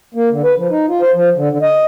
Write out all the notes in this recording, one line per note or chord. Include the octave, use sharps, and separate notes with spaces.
A#3
D3
B4
F3
D#4
F4
C5
F3
D3
D3
D#5